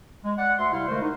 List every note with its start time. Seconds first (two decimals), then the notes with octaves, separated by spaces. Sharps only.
0.25 G#3
0.38 D5 F#5
0.59 D2 E5 C6
0.72 C3 G3 E4 F5 F#5
0.88 D3 G#3 A3 A#4 C5
1.02 D#4